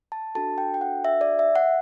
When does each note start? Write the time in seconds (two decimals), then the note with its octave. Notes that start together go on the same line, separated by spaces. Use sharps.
0.12 A5
0.35 D4 F#4 A4 A5
0.58 G5
0.74 G5
0.81 F#5
1.05 E5
1.21 D5
1.39 E5
1.55 F#5